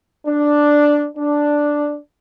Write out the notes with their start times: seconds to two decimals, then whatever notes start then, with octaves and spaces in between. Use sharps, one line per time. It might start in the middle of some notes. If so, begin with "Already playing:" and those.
0.27 D4
1.17 D4